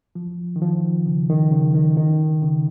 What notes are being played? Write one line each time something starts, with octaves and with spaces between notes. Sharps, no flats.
F3
D#3
F3
C#3
D#3
C#3
D#3
D#3
C#3